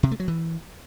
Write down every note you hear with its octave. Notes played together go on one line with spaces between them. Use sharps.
C3
A3
F#3
E3